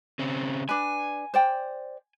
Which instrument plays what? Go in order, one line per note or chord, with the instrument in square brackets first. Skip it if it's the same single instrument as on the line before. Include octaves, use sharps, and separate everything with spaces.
[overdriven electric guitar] C#3 C4
[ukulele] D4 B4 [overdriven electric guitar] G#5
[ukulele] C5 D5 G5